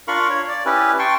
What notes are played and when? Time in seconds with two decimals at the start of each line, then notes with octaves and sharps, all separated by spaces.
0.08 D4 F4 A#4 F5 B5 C#6
0.30 C#5
0.48 D5
0.66 C#4 E4 G4 B4
0.99 G5 A5 C6 C#6